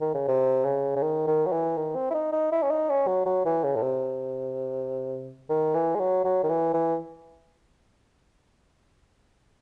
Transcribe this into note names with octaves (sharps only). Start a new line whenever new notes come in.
D#3
C#3
C3
C#3
C#3
D#3
D#3
F#3
E3
D#3
C4
E4
D#4
D#4
E4
C#4
D#4
C#4
F#3
F#3
E3
C#3
A2
C3
D#3
E3
G#3
F#3
F#3
D#3
E3
E3